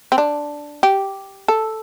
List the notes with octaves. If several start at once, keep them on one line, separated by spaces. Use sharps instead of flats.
C4
D4
G4
A4